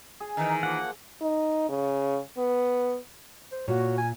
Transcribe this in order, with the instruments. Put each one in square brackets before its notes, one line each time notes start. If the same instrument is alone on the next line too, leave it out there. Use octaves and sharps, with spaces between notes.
[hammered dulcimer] G#4
[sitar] D#3 E3 [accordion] D#4
[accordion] F3 A#3 [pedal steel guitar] F#5
[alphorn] D#4
C#3
B3
[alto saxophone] C5
[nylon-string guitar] A#2 [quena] F#4 [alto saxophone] C#5
[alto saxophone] G#5